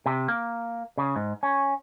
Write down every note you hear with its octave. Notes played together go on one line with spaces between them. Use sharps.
C3
A#3
C#3
G#2
C#4